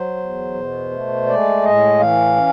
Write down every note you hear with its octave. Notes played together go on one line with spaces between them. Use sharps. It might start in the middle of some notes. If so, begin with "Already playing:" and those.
Already playing: F#3 C5
E2
B2
A3
G#3 D5
A2 D#5
E3 F5
C#4